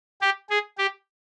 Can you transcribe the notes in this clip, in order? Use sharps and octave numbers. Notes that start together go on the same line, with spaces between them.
G4
G#4
G4